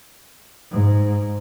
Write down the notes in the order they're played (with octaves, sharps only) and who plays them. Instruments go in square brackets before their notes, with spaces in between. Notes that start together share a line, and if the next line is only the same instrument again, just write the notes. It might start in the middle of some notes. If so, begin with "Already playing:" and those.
[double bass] G#2